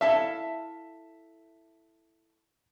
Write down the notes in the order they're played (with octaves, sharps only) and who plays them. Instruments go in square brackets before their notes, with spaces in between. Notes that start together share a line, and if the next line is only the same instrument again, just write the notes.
[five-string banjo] E4 A4 F5 [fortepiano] E5